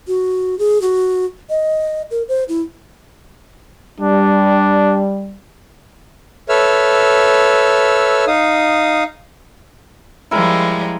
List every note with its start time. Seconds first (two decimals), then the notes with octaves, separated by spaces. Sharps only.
0.07 F#4
0.59 G#4
0.82 F#4
1.49 D#5
2.11 A#4
2.28 C5
2.48 E4
4.01 G3 D4
6.49 A4 B4 C#5 E5 E6 F6
8.27 D#4 F5 D#6
10.31 F3 G3 G#3 E4 A#4